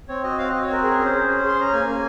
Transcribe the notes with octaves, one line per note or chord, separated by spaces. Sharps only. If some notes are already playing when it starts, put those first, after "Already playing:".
C4 C#5
F#4 D#5
C4 F5
F#4 D#5
C#5
C4 A#4
G#4 A#4
C#4
C5
G#4
C#4
G#4 C6
C#4 A#5
A#3 G#5
A#3